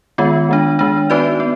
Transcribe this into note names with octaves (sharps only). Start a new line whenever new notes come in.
D#3 G#3 B3 F4
D#3 G#3 D4
D#3 G#3 D4
B3 D#4 F#4 B4 D5
B3